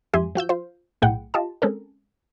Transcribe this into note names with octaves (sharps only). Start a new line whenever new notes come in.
F2 G#2 G4 E5 G#5 C6
F3 F#4 E6 G6
F4 C5
B1 A2 E4 G#4 F#5 G5
F4 G4 D#5 A5
G#3 C4 C#4 A4 A#4